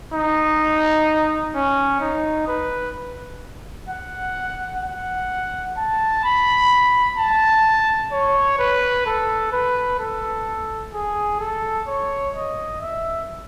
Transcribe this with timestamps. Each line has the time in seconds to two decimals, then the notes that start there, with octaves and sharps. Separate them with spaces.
0.13 D#4
1.55 C#4
2.01 D#4
2.48 B4
3.89 F#5
4.83 F#5
5.77 A5
6.24 B5
7.17 A5
8.12 C#5
8.59 B4
9.06 A4
9.53 B4
10.00 A4
10.94 G#4
11.40 A4
11.87 C#5
12.35 D#5
12.81 E5